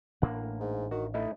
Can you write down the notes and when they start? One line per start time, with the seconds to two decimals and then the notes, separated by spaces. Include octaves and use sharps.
0.22 A1 A2 A#3 D4 F#5
0.60 G#2
0.91 D#3 F#4
1.14 A3 D#4 E4 D#5